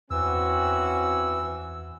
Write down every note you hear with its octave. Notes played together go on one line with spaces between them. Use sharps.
E2 E3 C4 C#4 F#4 E6